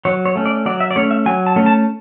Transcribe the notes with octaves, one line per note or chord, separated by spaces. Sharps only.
F#3 C#5
C#5
A3 C#4
D5
F#3 D5
E5
D5
A3 C#4 C#5
E5
F#3 G#5
A5
A3 C#4
A5